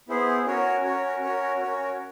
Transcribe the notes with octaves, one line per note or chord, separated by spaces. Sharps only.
B3 E4 G#4 C5
C#4 F#4 A#4 C#5
C#4 F#4 A#4 C#5
C#4 F#4 A#4 C#5
C#4 F#4 A#4 C#5